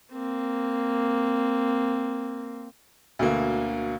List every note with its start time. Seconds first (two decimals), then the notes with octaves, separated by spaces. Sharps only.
0.13 A#3 C4
3.19 D2 B2 D3 A#3